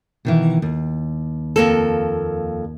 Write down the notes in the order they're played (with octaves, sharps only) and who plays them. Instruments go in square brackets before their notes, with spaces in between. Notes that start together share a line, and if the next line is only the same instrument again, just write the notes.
[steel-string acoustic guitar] B2 D#3 E3
D#2
[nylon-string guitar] F2 A#3 A4